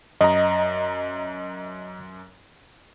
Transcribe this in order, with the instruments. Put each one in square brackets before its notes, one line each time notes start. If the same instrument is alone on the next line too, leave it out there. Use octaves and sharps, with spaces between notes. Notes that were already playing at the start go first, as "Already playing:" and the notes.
[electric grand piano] F#2 A#5 [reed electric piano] D#5